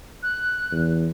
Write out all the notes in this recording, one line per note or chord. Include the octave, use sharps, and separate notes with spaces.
F#6
E2